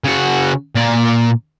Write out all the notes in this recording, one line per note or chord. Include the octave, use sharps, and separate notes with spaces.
C#3 F#4
A#2 D5